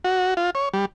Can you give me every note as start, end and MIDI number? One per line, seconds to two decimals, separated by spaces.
0.05 0.34 66
0.37 0.50 65
0.55 0.69 73
0.73 0.85 55